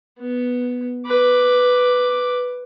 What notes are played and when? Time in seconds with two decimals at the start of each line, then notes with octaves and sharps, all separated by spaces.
0.19 B3
1.06 B4 D6